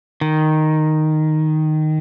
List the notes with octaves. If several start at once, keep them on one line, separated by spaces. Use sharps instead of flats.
D#3